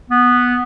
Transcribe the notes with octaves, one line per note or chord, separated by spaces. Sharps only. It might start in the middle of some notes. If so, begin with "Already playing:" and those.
B3